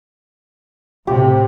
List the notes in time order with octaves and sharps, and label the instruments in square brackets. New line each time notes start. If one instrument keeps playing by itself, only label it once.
[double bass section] A2 C3 [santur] G4